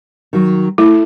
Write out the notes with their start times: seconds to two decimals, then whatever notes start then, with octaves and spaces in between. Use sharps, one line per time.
0.33 D#3 F#3
0.78 A3 E4